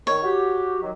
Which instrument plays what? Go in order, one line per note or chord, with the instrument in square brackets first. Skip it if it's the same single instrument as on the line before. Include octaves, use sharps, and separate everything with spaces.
[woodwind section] D#3 [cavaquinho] C#5
[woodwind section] F#4 G4
D#3 F#3